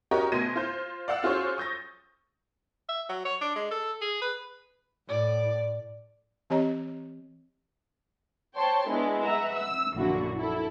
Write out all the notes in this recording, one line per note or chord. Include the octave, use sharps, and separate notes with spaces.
C#4 F#4 G4 A#4 C#5 D#5
D2 B2 C6 G#6 A#6 D#7
F4 C5 G6
D5 F5 F#5 E6
C#4 F4 F#4 G#4 C5 C#5
C#6 D#6 G6 A6 A#6
E5
F#3
C#5
D4
G#3
A4
G#4
B4
A2 D5
E3 C4 G4 C#5 D#5 A#5
C5 C#5 G5 A5 C6
G#3 B3 D4 E4
B4 E5 F#5 A#5
E6
A#1 F#2 A#2 D3 E4 F#4
E4 A4